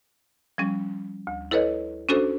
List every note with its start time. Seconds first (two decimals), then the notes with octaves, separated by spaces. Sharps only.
0.58 F3 G3 C#4
1.27 D2
1.51 E4 A4 B4 C#5 D#5
2.09 C#4 D4 F#4 A4 C5